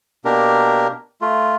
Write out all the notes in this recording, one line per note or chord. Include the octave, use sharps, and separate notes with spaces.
B2 A#3 D4 G4 A#4
A3 F4